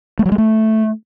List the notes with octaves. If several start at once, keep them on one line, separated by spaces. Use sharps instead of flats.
A3
F#3
G#3
A3